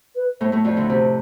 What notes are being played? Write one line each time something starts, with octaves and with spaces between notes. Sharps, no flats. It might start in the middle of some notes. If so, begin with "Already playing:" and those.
B4
A2 A3 C5
A2 A3
F2 F3 D5
D2 D3
C3 C5